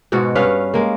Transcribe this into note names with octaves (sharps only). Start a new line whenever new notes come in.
G#2 B2 G#3 F#4
G2 C#4 B4 F5
G#3 A#3